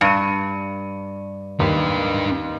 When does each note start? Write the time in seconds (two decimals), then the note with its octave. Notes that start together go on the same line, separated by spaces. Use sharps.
0.01 G2 C#7 D#7
1.60 D#2 D4 B4